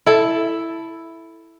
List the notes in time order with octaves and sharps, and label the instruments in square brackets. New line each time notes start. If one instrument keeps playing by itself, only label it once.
[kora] E4 A4